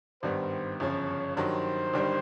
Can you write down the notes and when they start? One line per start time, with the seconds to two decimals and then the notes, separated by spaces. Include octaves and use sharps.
0.22 G#1 G2 D#3 G3 B3 C5
0.80 G1 F#2 C#3 F3 C#5
1.37 G2 D#3 F#3 C5
1.93 G1 G2 D#3 G3